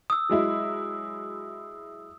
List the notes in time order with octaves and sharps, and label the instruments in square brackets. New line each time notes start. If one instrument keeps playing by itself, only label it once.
[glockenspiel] D#6 E6
[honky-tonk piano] F#3 G#3 E4